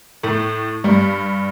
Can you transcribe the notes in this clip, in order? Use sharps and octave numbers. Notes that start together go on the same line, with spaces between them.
A2 A3
G2 G3